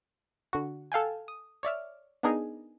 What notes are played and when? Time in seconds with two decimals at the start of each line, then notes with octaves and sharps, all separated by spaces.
0.53 D3 F#4
0.92 A4 F5 G5 G#5
1.28 D#6
1.63 C#5 D5 E5 F6
2.23 B3 D4 D#4 G#4 A#4